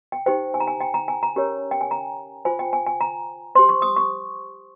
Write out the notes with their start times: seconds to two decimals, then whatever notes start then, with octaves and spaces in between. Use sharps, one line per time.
0.12 G5
0.26 D#4 G4 C5 G5
0.54 G#5
0.60 A#5
0.68 G#5
0.81 G5
0.94 A#5
1.08 G#5
1.23 A#5
1.36 C#4 G4 A#4 C#5
1.71 G5
1.81 G#5
1.91 A#5
2.45 F4 C5 G#5
2.59 G5
2.73 G#5
2.86 G#5
3.01 A#5
3.55 G4 C5 C6
3.69 C#6
3.82 D#6
3.97 C#6